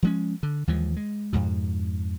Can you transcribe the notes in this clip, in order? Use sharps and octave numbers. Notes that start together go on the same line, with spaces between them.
F3 G#3 C#4
D3
D#2 E3 F3 G#3
G#3
F2 G#2 B2